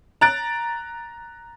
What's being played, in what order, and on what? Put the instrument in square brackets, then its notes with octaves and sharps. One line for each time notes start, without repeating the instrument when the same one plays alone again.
[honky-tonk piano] A#5 F#6 A6 D7